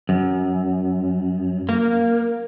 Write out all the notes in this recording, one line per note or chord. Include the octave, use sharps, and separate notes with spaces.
F#2
A#3